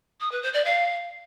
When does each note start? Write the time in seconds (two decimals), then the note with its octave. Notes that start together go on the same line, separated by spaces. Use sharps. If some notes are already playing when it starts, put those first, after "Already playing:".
0.20 D#6
0.31 B4
0.42 C5
0.53 D5
0.64 F5